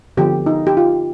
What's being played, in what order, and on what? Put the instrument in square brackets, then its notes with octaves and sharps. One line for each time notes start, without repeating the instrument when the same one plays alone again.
[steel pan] D3 F3 B3 G4
D#4
G4
F4